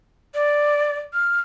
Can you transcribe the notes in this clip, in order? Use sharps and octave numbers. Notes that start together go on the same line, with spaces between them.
D5
F6